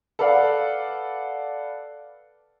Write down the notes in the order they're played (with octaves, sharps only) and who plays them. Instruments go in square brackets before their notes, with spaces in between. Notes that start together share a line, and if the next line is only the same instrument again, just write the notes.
[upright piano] A4 B4 D5 F5 F#5